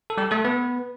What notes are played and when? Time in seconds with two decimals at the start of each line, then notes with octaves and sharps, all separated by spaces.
0.10 A4
0.18 G3 G4
0.31 A3 A4
0.45 B3 B4